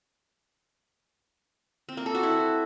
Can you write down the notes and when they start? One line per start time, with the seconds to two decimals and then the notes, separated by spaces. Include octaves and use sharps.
1.89 C4
1.97 A#3
2.06 A4
2.15 F#4
2.23 E4